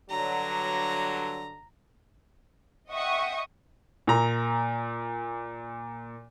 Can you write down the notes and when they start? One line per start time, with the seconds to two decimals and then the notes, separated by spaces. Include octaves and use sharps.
0.10 G2 D3 F#3 A#5
2.90 D#5 E5 F#5 G5 C#6 D#6
4.07 A#2 A#5